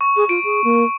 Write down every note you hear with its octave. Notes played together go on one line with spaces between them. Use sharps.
C#6
G#4
F4 D7
G#4
A#3